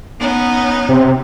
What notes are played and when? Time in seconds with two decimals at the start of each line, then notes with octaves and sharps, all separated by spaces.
0.20 B3 C#4 D#4
0.89 C3